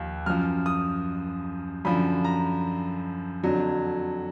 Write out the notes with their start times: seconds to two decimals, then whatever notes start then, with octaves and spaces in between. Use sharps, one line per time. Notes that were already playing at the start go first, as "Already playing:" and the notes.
Already playing: D#2 F3
0.26 F#2 F3 F6
0.66 D#6
1.85 F#2 D3 F3 B5
2.24 A#5
3.43 F2 D3 F#3